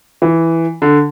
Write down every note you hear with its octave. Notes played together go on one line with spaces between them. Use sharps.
E3
D3